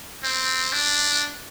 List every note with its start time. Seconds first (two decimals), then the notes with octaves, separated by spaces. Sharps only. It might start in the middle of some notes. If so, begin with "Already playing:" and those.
0.24 C4
0.72 D4